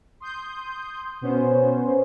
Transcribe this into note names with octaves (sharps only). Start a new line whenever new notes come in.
C6 D#6 G6
B2 B3 C#4 C5